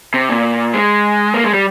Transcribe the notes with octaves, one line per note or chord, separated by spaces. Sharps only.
C3
A#2
G#3
A#3
G#3
G3